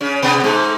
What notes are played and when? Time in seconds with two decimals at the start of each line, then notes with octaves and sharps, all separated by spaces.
0.01 C#3 C#4
0.22 B2 B3
0.44 G#2 G#3